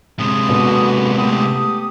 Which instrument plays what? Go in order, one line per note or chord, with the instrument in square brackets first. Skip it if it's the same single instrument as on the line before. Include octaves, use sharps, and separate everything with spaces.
[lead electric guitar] C3 G#3 [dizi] D#6
[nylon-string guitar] B2 D3 [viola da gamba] A#3 F#4 B4
[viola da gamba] A3 G4 [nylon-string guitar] B3 [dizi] D#6